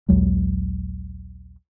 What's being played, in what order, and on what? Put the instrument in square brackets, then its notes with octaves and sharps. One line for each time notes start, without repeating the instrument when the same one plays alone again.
[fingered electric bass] A#1 D#2 F#3 G#3